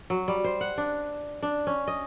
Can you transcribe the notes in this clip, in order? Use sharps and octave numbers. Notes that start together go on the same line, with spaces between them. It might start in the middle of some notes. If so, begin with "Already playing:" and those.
F#3
G3
C5
F#5
D4
D4
C#4
D#5